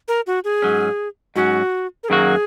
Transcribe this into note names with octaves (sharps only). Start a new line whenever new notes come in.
A#4
F#4
G#4
G#2 F#3 C#4
G#2 F#3 C#4 F#4
A#4
F#2 D#3 F#3 A#3 F#4 G#4